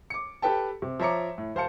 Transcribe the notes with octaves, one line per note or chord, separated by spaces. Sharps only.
D6 C#7
G4 A4 B4 G5 A5
C3
F3 C#5 E5 A#5 D6 C#7
A2
E1 C5 F5 A5 C#7